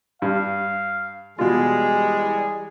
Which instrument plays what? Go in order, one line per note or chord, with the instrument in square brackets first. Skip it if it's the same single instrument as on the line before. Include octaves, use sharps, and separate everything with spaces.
[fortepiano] G2 [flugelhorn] F5
[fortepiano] B2 F4 [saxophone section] E3 G3 G#3 [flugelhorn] G#4